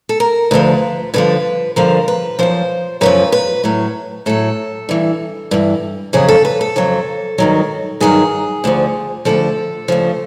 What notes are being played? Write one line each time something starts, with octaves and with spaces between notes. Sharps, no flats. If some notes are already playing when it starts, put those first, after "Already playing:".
A4
A#4
D2 D3 F3 B4
G2 D3 F3 B4
G2 D3 F3 A#4
B4
F#2 C#3 F3 C5
F#2 C#3 F3 B4
B4
A2 F#3
A2 F#3 A4
G2 E3
G2 E3
F2 C#3 F#3 G#4
A4
B4
A4
F2 C#3 F#3
G2 D#3 F#3
G2 D#3 F#3 G#4
D2 D3 F3
D2 D3 F3 A4
D2 C#3 F3